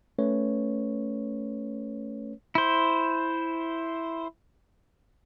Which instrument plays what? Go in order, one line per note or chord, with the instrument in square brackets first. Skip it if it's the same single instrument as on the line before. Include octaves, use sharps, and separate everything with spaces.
[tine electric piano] A3 C#4 B4 C#5
[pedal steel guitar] E4 C5